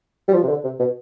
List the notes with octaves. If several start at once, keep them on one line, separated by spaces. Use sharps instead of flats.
G3
F3
C3
D3
C3
B2